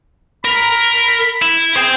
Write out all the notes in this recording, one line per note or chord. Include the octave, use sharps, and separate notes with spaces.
A#4 B5
E4
G#4 C5 G5